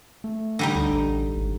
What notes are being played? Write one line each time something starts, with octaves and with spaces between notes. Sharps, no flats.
A3
D3 G3 D#4
D2
A1
G#1